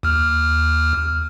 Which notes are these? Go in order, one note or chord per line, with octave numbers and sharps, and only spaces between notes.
D#2 F6